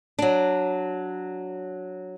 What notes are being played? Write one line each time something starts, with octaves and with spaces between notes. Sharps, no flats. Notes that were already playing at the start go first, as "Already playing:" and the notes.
F#3 D4